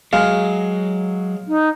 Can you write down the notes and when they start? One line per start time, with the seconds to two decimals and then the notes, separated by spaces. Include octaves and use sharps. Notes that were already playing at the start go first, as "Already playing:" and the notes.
0.13 F#3 G#3 F5
1.47 D#4